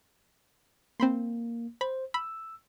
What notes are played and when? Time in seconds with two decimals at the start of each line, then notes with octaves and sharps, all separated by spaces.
1.00 A#3 C4 B5 C6
1.81 C5 B5
2.14 B5 E6